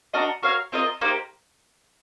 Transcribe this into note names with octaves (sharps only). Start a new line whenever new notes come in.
D4 F#4 A#4 D#5
F#4 A#4 C#5 F5
C4 F4 A#4 D#5
A#3 D#4 G4 C5